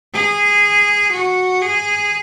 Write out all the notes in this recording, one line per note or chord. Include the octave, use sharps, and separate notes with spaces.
G#4
F#4
G#4